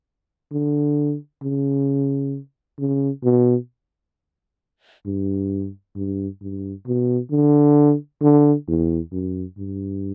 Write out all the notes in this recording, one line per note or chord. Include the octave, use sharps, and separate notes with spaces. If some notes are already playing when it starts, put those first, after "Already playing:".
D3
C#3
C#3
B2
G2
G2
G2
B2
D3
D3
E2
F#2
G2